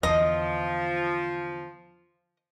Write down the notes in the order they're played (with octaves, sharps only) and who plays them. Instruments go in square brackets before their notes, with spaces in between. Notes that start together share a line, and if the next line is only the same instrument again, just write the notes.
[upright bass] E2 D3 [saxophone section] F3 [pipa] D#5